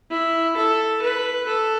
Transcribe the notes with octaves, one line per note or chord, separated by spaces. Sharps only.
E4
A4
B4
A4